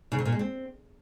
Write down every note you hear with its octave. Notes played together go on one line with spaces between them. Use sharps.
C#3
C3
A#2
G#3
C4